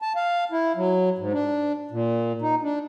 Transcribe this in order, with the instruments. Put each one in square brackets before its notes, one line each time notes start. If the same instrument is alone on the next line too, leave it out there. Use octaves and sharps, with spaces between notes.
[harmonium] A5
F5
E4
F#3
G#2
D4
A#2
D#4
D4